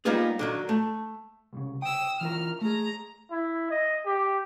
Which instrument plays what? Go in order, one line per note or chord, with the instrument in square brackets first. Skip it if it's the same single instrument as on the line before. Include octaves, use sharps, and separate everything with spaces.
[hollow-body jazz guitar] G3 A#3 B3 D#4 F4 G#4
D3 D#3 F#3
A3
[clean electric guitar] C2 A2 C#3
[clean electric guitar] G5 [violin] D#6 E6
[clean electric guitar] E3 F4 A#4 [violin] F6
[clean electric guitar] A3 G#4 [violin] A#5
[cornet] E4
D#5
G4